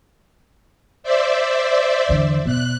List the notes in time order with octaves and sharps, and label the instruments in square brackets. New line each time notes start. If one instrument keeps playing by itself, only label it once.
[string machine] C5 D5 E5
[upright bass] E2 D3
[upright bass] B2 [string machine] F#6